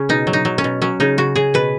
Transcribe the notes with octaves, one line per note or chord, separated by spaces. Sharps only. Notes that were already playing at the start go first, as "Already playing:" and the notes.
Already playing: C#3 C#4
B2 D#4
F#3
D#4
F#3
C#4
B2
F#3 C#4
C#3 D#4
C#3 F#4
C#3 G#4
B2 B4